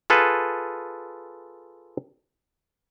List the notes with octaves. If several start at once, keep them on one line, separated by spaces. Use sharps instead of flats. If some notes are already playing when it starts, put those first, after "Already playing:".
F4 G#4 A4 B4